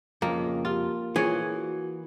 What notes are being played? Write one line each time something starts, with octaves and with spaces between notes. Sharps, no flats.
F2 C#3 A#3
F4 G4
E3 F4 G#4 C#5
F#4